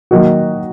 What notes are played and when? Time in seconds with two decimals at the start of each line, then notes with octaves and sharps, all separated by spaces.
0.11 D#3 F#3 A#3 D#4 F#4